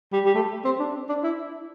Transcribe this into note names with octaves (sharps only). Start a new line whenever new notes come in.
G3
G3
A3
C4
D4
D4
E4